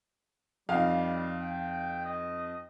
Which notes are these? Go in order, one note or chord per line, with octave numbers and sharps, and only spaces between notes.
F2 G3 D#4 F5
G5
D#5